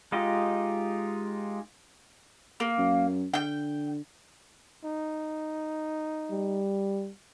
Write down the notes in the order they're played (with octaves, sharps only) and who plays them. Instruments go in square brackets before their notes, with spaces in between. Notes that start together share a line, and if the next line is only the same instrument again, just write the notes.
[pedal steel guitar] G#3 D#4 F4 G4 D#5
[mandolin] A#3
[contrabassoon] F#2
[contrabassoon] D3 [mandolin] G5 G6
[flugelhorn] D#4
[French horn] G3